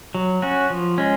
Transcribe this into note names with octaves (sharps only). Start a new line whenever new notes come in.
F#3
C#4 F#4
F3
G#3 C#4